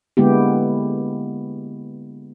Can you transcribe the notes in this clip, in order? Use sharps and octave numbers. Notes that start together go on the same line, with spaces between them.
D3 G#3 A#3 B3 E4 G4